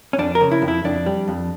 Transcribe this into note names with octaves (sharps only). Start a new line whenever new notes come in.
C#4
F2 D4
A#4
C#3
E4
F2
E4
F2 D4
G3
F2